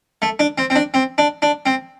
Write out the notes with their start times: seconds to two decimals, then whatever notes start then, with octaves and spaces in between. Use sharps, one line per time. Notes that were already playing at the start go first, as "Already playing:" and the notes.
0.22 A3
0.39 D4
0.58 C4
0.70 C4
0.75 D4
0.94 C4
1.18 D4
1.42 D4
1.66 C4